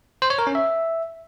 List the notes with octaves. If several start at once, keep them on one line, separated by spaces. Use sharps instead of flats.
C5
C#5
A#4
C#4
E5